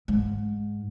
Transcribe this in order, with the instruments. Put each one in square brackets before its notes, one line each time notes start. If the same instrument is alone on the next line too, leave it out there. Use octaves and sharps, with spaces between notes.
[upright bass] G#2